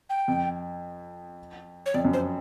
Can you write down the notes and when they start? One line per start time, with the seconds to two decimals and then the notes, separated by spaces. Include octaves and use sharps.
0.10 G5
0.28 F2
1.86 C#5
1.94 F2 D5
2.05 F#2
2.13 C5